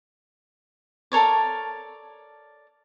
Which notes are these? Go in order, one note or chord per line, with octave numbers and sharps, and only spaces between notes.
A4 A#4 C#5 D5